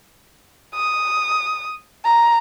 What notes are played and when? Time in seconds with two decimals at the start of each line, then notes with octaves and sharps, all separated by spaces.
0.75 D#6
2.05 A#5